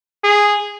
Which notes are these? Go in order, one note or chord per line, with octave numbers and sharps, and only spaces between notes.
G#4